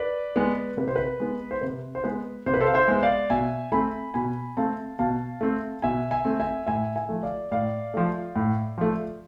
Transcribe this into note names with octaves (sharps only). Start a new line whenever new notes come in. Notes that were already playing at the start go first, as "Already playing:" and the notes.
Already playing: B4 D5
G#3 B3
C3 B4
C5
B4
G#3 B3
C5
C3 B4
C5
G#3 B3 B4
C3 C5
B4
A4 C5
F5
C5 E5
G#3 B3
D5 F5
B2 E5 G#5
A3 C4 G#5 B5
B2 G#5 B5
A3 C4 F5 A5
B2 F5 A5
A3 C4
B2 E5 G#5
E5 G#5
A3 C4
E5 G#5
A2 E5 G#5
E5 G#5
F3 A3
D5 F5
A2 D5 F5
F3 A3
A2
F3 A3